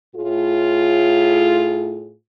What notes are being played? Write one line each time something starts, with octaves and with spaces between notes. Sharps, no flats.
A2 F4 G#4